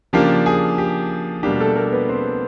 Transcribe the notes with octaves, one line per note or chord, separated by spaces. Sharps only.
C#3 F3 A#3 D4 G4
G#4
G4
B2 G3 A#3 D4 G4
A3 A4
A#3 A#4
B3 B4
C4 C5